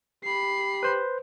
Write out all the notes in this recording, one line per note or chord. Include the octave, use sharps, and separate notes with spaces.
G4 B5 C7
B4 C5